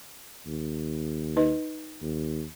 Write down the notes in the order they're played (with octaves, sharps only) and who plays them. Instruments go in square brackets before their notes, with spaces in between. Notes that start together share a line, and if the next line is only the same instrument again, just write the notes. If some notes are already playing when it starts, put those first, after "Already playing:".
[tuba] D#2
[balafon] D#4 B4 D#5
[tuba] D#2